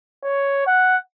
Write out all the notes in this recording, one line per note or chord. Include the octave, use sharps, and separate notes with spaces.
C#5
F#5